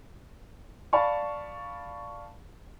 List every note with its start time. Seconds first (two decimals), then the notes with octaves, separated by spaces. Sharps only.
0.93 D5 F5 A5 B5 C#6